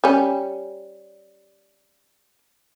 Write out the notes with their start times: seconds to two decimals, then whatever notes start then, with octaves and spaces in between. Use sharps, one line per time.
0.04 G3 C#4